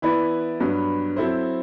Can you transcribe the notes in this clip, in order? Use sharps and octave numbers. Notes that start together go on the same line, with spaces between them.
E3 B3 E4 B4 D5
G2 F#3 B3
F#3 C4 E4 A4 C5